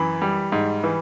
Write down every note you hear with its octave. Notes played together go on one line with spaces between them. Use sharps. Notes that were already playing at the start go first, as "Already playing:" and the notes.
Already playing: F#2 E3 B5
G3
G#2
E3